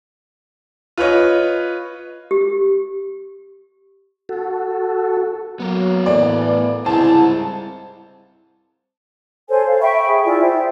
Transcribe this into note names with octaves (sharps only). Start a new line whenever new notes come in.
F4 B4 C#5 D#5
G4
F#4 A4
F#3 A#3 B3 A#4
A2 E3 D5
C#2 G#2 G3 C4 E4 C5 A5
A4 C5 C#5 G#5
F5
E5 G5 B5 C#6
G#4
E4 F4 G#4 D5
C5 E5 G5